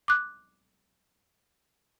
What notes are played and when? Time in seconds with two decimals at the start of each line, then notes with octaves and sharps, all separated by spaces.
0.08 D6 F#6